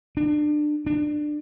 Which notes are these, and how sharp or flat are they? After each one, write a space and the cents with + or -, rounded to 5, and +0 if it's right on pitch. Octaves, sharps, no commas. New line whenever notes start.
D4 +25
D4 +20